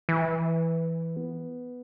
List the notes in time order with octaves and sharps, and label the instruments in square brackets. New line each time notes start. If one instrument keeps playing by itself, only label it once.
[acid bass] E3
B3